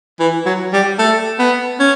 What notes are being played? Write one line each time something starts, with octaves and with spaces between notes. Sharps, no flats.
E3
F#3
G3
A3
B3
C#4